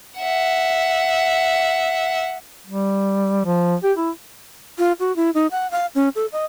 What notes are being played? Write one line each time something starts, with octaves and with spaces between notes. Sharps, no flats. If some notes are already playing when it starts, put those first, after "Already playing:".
E5 F#5
G3
F3
G4
E4
F4
F#4
E4
D#4
F#5
F5
C#4
A4
D#5